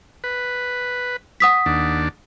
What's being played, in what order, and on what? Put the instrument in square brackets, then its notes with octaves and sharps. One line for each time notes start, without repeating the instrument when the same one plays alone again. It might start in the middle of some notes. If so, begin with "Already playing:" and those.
[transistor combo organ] B4
[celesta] F#5 D#6 B6
[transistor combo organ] D#2 D4